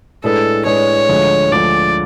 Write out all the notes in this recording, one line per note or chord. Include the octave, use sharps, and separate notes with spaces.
A2 G#3 D4 G#4 A4 B4
A2 G#3 D4 G#4 B4 C#5
D2 D3 F3 G#3
D2 D3 F3 G#3 D5